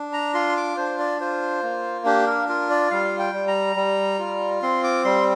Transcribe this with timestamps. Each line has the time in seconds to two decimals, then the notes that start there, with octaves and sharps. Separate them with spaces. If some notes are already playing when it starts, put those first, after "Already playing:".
Already playing: D4
0.13 A#5
0.34 F4 C6
0.57 D6
0.77 D4 C5
0.99 D5
1.21 F4 C5
1.63 A#3
2.05 D4 G4
2.26 A#4
2.49 F4 A#4
2.70 D5
2.91 G3 F5
3.19 G5
3.33 G3
3.47 A#5
3.76 G3
4.19 F4
4.62 C4 C6
4.84 D6
5.05 G3 C6